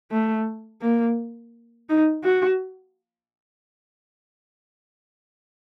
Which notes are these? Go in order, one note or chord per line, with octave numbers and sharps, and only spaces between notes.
A3
A#3
D#4
F#4